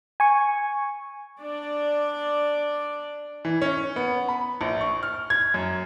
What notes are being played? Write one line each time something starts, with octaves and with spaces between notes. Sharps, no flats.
G#5 C#6
D4 D5
E3
C#4
B3
B5
A#1
C#6
F6
G#6
F#2